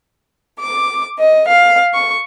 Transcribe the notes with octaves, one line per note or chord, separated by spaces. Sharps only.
D6
D#5
F5
C#6